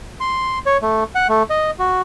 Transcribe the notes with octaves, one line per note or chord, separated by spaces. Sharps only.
C6
C#5
A3
F#5
A3
D#5
F#4